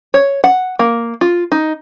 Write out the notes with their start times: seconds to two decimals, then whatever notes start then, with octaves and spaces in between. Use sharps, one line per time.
0.14 C#5
0.44 F#5
0.79 A#3
1.21 F4
1.52 D#4